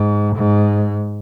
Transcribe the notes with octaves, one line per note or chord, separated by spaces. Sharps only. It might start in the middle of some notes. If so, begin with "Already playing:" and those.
Already playing: G#2
G#2